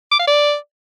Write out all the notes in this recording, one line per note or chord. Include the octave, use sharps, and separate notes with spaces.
D6
F5
D5